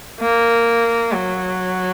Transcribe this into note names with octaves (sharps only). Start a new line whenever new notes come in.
A#3
F#3